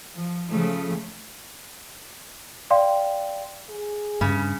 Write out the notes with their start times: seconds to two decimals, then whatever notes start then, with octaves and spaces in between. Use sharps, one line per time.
0.15 F3
0.49 C#3 F3 A3
2.70 D5 F5 G5 C6
3.70 G#4
4.21 G2 C#3